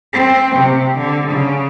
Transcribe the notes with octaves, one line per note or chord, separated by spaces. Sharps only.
C4
C3
D3
C#3